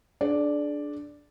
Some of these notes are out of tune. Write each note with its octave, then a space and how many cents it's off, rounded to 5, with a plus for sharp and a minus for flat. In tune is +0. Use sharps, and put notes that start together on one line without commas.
D4 +0 G#4 +35 D5 +0